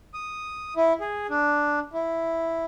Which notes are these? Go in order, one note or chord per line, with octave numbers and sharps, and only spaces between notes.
D#6
E4
G#4
D4
E4